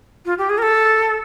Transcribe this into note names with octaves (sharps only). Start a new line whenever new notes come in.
F4
G4
G#4
A#4
A4